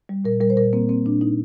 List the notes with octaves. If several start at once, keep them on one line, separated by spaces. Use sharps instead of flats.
G3
A#2 A#4
G3 A#4
C5
A#2 A#4
A#3 C4
A#3 C4
A#2 D4
A#2 D#4